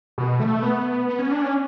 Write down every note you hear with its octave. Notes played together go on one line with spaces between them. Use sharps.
B2
A3
B3
B3
C#4
D4
C#4